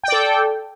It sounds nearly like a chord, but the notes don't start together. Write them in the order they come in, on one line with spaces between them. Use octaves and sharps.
G5 D5 A4